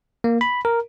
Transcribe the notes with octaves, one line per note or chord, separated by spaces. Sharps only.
A#3
B5
A#4